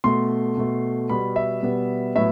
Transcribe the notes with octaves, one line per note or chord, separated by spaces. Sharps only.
B2 A3 C6
B2 A3
B2 G3 B3 B5
E5
B2 G3 B3
A2 F#3 B3 E5